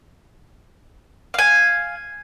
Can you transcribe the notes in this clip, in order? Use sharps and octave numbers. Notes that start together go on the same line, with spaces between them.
F5 G#5